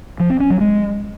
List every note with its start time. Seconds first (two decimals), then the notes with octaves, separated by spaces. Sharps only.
0.20 F3
0.30 C4
0.40 C#4
0.50 F#3
0.60 G#3